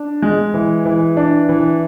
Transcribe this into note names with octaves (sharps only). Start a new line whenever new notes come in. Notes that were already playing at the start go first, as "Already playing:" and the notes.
Already playing: D4
G#3
E3
E3
D4
E3